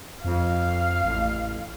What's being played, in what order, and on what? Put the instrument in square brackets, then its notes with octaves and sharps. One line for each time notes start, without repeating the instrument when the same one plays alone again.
[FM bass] F2 [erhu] F5
[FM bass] A1